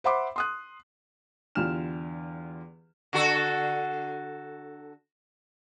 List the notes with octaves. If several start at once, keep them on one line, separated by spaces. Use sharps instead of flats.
C5 E5 F#5 B5 C6 D6
C6 D#6 F#6
E2 D3 F4 G4 F6 E7
D3 F#4 A4